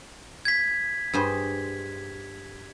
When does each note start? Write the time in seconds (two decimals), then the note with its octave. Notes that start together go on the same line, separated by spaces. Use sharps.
0.45 G#6 B6
1.13 G2 G#4 C5